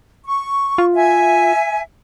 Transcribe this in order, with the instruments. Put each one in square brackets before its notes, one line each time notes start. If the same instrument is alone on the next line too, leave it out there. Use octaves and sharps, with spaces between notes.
[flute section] C#6
[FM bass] F4
[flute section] E5 G#5